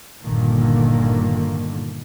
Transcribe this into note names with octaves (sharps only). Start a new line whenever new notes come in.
G1 A#2 D3 D#3 A#3